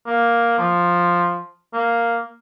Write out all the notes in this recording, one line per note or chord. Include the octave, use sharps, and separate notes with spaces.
A#3
F3
A#3